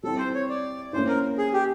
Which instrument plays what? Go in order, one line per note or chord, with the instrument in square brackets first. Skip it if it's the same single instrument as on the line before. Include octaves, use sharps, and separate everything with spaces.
[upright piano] G3 C4 E4 [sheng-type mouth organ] A4
[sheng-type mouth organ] C5
C#5
D5
[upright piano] A#3 C#4 E4 [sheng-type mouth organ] C5
[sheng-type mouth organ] A#4
G#4
G4